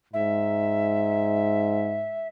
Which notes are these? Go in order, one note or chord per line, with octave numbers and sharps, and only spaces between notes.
G#2 E5